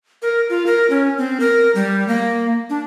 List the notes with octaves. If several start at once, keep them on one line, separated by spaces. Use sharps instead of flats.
A#4
F4
A#4
C#4
C4
A#4
G3
A#3
D4